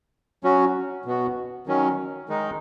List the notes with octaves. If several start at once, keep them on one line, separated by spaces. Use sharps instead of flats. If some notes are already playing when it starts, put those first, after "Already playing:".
F#3 C#4 F#4
B2 B3 F#4
D#3 F#3 C#4
D#3 G#3 D#4